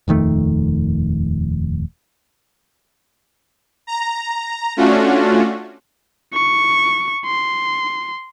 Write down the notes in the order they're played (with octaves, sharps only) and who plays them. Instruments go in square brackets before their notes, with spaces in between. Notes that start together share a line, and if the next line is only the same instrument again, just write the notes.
[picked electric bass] D#1 F2 D#3 A3
[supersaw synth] A#5
A3 C#4 D4 F4 F#4
[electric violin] C#6
C6